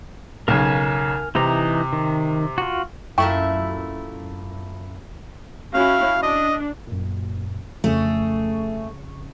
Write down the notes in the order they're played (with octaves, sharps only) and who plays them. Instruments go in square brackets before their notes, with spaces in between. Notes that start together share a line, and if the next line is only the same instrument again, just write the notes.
[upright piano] B1 C#3 [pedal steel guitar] A#4 G#5
[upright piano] C3 [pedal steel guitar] E3 D#4 A#5
[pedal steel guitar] D#3
F4 F#4
[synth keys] F#2 [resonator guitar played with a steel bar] A#2 A3 E4 [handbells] G5 C#6
[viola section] C#4 E4 F#4 [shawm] F5
[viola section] D4 [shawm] D#5
[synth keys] F#2 A#2
[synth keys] F2 C#3 C#6 [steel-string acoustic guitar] A3 G#4